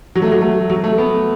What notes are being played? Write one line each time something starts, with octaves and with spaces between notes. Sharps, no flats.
F#3
A3
F#3
A3
F#3
A3
B3